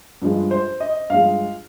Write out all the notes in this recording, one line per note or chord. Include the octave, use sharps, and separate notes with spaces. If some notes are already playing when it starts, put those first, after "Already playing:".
G2 F3 G#3
C5
D#5
G2 F3 G#3 F5